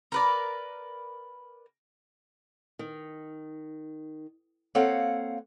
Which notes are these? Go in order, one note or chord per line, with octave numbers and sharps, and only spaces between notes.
A#4 B4 D5
D#3
A#3 C4 A4 C#5 F5 F#5